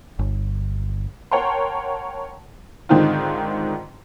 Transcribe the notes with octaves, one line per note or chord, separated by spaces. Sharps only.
G1
A#4 C#5 F#5 G5 A5 C6
G#2 D3 D#3 C4 D#4 F4